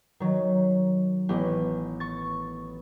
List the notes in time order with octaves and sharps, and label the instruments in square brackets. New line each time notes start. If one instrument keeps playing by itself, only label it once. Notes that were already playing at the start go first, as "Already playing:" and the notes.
[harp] D#3 F#3
A1 B3 G4
C#6 A6